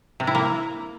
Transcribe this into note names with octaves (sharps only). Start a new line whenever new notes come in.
C3
E4
A#3